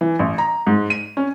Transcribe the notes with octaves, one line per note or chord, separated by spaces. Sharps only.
E3
A1
A#5
G#2
D#7
C#4